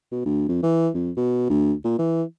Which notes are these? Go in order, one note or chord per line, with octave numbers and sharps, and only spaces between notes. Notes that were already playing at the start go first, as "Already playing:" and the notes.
B2
D2
F2
E3
F2
B2
D2
A#2
E3